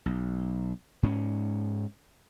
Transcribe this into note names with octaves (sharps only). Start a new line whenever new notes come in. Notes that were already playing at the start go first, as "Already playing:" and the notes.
B1
G#2 C4 C#4